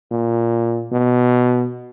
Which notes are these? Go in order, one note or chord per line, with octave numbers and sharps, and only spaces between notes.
A#2
B2